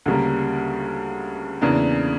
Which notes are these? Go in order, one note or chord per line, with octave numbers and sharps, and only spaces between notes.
D2 C#3 G3 A#3
E2 C#3 E3 A#3 D4